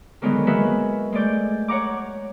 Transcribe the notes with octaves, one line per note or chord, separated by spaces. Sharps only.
D3 D#3 F#3 G#3 B3 D#4
G#3 A#3 F#4 B4 E5
G#3 A3 D5 G6
C#5 F#5 A#5 D6